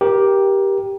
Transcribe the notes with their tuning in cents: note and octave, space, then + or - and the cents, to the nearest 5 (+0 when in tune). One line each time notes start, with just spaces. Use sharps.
G4 +0 A#4 +20